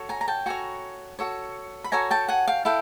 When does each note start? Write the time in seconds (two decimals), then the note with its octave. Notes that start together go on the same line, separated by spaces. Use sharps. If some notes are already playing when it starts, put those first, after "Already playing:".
Already playing: F#4 A4 C#5
0.09 G#5 A#5
0.21 A#5
0.28 G5 A5
0.46 F#4 A4 C#5 G#5 A#5
1.19 F#4 A4 C#5
1.84 B5
1.92 F#4 A4 C#5 G#5 A#5
2.11 G5 A5
2.28 F#5 G#5
2.48 F5 G5
2.65 E4 A4 F5 G5